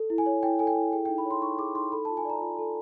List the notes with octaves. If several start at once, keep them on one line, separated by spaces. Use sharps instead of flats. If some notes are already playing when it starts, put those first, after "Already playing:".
Already playing: A4
E4
G#5
C#5
E4 G5
A4 G#5
G5
E4
G#4 G5
G5
D#4
B5
C#5
C6
D#4 C#6
G#4 D6
D#4 C6
A4 B5
A5
F4
G#5
D5 A#5
F4
A4